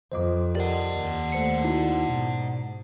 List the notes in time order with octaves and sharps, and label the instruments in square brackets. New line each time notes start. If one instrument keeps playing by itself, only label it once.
[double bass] F2 [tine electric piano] C5 D#5 D6
[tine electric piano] G4 A#4 D#5 [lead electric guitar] D5 F#5
[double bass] D#2
[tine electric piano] A3 C5 C#7
D#4 E4 F#4
[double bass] G#2 [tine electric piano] B2